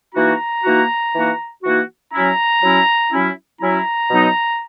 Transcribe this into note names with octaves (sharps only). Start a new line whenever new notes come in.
E3 A#3 D#4 F#4 A#5
E3 A#3 D#4 F#4
E3 A#3 D#4 F#4
E3 A#3 D#4 F#4
F#3 C#4 E4 A#5
F#3 C#4 E4
F#3 C#4 E4
F#3 C#4 E4 A#5
B2 F#3 B3 D#4